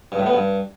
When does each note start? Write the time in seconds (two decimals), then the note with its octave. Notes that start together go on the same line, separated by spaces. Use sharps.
0.12 G2
0.19 A2
0.26 B3
0.33 G2